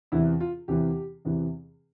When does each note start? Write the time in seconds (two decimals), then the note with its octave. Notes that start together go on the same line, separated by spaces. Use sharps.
0.12 E2 C3 E3 E4
0.40 F4
0.68 E2 C3 E3 G4
1.25 E2 C3 E3